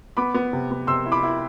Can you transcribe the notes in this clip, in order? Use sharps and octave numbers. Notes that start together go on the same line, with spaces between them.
B3 B5 D6
B3
C3
B3
C3 C6 E6
E4
B5 D6
E4